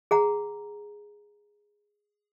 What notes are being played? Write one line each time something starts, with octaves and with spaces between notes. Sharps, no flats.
G#4 F#5 A#5